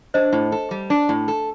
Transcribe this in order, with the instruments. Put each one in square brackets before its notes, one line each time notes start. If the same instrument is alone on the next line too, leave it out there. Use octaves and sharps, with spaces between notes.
[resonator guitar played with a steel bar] D4 [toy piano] C5 D#5
[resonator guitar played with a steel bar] A2
A4
G3
D4
A2
A4